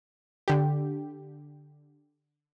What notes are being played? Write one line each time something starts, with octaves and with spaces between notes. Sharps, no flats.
D3 G4